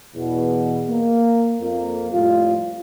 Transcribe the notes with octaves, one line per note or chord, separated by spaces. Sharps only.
E2 B2
A#3
F2 A#3
F2 A2 G3 F4